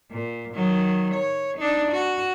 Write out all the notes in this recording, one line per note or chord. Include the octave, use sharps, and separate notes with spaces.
A#2
D#3 F#3
C#5
D4 D#4
F#4